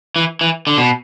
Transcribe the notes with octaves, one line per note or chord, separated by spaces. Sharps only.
E3
E3
D3
B2